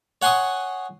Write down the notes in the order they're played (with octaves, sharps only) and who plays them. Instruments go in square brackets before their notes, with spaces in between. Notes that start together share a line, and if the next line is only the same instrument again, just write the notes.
[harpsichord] C#5 F#5 G#5 C6 C#6 D#6